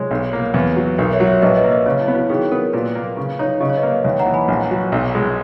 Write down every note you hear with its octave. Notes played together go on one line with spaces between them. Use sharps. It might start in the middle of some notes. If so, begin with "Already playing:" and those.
Already playing: G#3 C#5
B1
A#3
E2 B4
F#3
B1 A#4
C#5 E5
F#3
C#5 E5
A#1 B4 D#5
B4 D#5
A#3
B4 D#5
C#3 C#5
E4
B3
F#4
D#3 G#4
B3 A#4
A#2 B4
A#3
C#3
D#4 C#5
C#3 D#5
C#5
B4 D#5
A#3
D#2 C#5 E5
F#5 A#5
E3
G#5 B5
A#1
F#3
B1
G#3